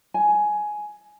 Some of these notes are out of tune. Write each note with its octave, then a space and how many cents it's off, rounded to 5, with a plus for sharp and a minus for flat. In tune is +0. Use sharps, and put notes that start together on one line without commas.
G#5 +10